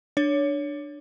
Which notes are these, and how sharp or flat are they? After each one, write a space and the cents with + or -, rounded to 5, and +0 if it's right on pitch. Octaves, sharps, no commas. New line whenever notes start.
D4 +10 C#5 +20